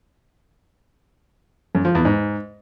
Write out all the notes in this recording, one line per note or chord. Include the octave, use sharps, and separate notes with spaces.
F#2
F3
E2
G#2